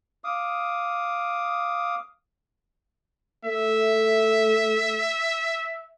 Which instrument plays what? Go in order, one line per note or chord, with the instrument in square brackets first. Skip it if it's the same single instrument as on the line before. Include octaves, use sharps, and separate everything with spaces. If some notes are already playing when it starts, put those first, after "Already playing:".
[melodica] F5 D6 D#6
[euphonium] A3 [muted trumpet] E5